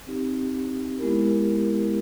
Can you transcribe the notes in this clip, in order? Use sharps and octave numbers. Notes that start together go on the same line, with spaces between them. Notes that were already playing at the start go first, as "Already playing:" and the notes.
C4 D#4 G4
G#3 B3 E4 G4 A#4